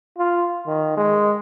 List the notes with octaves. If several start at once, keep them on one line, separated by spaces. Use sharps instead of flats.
F4
D#3
G#3